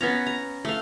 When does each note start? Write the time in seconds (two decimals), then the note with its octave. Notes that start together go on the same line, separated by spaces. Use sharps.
0.01 B3 C#4 A#5
0.27 A#5
0.65 A3 F5